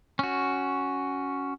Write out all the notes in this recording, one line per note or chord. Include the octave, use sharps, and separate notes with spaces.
C#4 F#4